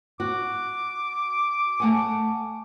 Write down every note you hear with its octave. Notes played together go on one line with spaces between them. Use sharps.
F#4 D6
A3 F#5 G#5